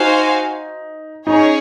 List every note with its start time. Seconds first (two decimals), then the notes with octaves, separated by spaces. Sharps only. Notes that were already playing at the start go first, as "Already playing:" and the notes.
Already playing: D#4 F#4 C5 F5 G#5
1.26 C#4 D#4 G#4 C#5